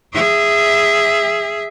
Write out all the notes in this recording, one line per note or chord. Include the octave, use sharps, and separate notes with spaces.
G#4 E5